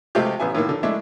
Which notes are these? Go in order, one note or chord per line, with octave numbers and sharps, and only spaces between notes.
C3 G#3 A3 C4 F4 G4
A1 B3 E4 G#5
A2 D#3 A#3
D3
G#3 A3 D4 E4